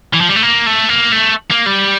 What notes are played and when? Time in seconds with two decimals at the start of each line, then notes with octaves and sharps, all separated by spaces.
0.13 E3
0.21 F3
0.29 G3
0.35 A3
0.42 A#3
0.66 A3
0.89 A#3
1.12 A3
1.51 A#3
1.67 G3